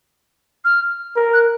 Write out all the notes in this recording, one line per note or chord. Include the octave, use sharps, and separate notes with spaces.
F6
A#4
F#6